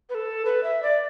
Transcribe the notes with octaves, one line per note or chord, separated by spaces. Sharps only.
B4
A4
B4
E5
D5